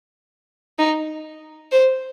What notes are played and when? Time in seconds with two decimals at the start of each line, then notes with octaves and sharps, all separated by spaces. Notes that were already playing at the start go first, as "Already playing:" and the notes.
0.79 D#4
1.72 C5